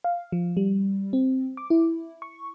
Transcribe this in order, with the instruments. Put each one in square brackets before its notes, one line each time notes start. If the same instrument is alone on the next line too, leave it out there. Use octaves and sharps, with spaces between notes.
[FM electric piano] F5
F3
G3
C4
D6
E4
C#6